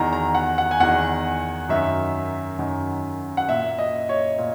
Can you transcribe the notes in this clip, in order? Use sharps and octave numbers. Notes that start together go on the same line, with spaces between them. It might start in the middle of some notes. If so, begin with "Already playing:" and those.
Already playing: E2 D#3 A#5
A#5
F#5
F#5
G#5
E2 D#3 F#5
F#2 D#3 E5
F#2 D#3
F#5
A#2 E5
D#5
C#5
A#2